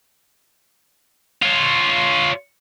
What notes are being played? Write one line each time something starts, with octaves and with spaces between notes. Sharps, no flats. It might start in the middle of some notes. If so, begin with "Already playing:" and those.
F4 C#5